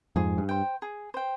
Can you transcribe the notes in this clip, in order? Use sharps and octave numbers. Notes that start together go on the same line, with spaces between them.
F2 G#2 G#4
G2
C5 G5
G#4
C5 G5